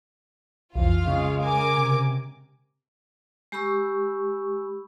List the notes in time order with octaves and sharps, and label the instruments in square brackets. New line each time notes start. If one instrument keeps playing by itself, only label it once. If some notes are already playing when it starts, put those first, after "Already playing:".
[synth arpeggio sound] B1 F2 [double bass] E3 [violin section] F4 F5
[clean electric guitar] C#3 [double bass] G#3
[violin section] A#4 G#5 D6
[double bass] C3
[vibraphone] G#3 G4 B5 C#6 E6